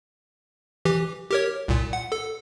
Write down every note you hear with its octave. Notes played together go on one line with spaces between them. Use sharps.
E3 G4
G4 A#4 C#5
C2 A#2
F#5
A4